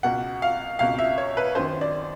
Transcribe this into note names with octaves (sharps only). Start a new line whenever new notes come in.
C#2 B2 F#5
F5
C#2 B2 F5
E5
C#5
B4
F#2 D#3 C5
D5